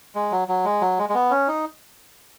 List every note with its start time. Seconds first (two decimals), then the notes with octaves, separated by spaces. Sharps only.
0.15 G#3
0.31 F#3
0.48 F#3
0.65 G#3
0.81 F#3
0.98 G#3
1.09 G#3
1.15 B3
1.31 C#4
1.48 D#4